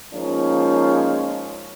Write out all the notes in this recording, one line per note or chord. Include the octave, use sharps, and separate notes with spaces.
F3 G#3 A#3 C#4 D#4 F4